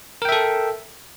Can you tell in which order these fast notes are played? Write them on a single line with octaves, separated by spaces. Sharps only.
A#4 G5 E5 A4